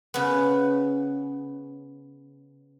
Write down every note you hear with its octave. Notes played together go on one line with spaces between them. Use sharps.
C#3 B3